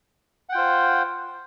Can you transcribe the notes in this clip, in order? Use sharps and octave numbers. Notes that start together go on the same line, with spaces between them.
F4 C5 F#5 G5